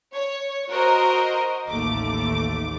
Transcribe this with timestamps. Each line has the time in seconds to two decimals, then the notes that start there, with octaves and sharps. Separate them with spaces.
0.15 C#5
0.70 F#4 A#4 C5 D#5 A#5
1.70 A1 D#2 A3 D6